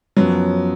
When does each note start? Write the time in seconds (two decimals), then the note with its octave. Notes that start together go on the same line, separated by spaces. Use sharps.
0.17 F#2 F3 F#3 B3